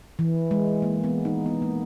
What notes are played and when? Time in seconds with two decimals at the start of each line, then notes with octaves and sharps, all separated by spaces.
0.19 E3
0.51 G#3
0.82 A#3
1.04 B3
1.25 D#4
1.46 B3
1.62 A#3